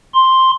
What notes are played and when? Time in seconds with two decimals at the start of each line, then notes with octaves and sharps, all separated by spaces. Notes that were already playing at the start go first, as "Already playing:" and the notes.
0.14 C6